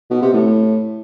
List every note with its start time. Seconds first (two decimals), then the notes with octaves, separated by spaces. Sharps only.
0.10 B2
0.22 C3
0.33 A2